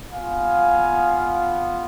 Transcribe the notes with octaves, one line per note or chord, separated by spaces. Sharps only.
B3 F4 F5 G#5